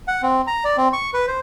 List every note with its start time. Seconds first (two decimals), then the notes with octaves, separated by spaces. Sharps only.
0.08 F#5
0.22 C4
0.47 A#5
0.65 D5
0.77 C4
0.93 C#6
1.14 B4
1.28 C5